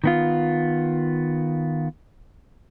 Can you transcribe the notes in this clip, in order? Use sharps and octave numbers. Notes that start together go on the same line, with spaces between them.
D#3 B3 F4